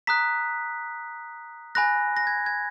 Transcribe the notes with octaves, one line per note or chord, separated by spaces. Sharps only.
A#5 D#6 F#6 B6
G#5 B5 F#6 A#6
A#6
G#6
G#6